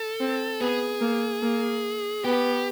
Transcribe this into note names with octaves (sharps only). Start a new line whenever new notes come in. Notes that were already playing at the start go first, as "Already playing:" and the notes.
Already playing: A4
C4
B3 G#4
A#3
A#3
B3 G4